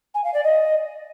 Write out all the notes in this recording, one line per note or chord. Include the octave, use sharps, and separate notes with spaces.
G#5
F5
D5
D#5